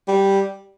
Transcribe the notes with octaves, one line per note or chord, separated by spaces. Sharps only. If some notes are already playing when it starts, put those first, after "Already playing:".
G3